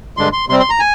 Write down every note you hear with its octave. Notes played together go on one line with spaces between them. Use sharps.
G2 D3 G#3 D4 C6
C6
C3 G3 C4 C6
C6
A#5
G#5